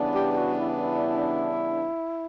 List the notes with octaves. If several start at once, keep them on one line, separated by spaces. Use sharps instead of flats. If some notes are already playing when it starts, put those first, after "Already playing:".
Already playing: C#3 E3 G3 B3 D4
G4
G4
F#4
E4
E4